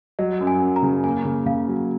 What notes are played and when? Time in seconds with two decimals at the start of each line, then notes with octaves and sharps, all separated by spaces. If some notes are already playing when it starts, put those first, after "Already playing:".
0.19 F#3 D#5
0.41 F#2
0.47 G#5
0.62 F#2
0.76 A#5
0.83 C#3
1.04 A#3 G#5
1.25 C#3
1.46 C#3 F5
1.68 F#3